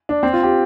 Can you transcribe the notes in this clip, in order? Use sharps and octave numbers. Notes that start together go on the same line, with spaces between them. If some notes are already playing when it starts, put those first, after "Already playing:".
D4
C4
F4
G4